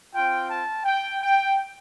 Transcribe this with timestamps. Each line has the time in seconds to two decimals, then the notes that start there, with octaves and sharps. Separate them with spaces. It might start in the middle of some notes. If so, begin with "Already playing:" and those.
0.15 C4 F4 G5
0.50 A5
0.85 G5
1.22 G5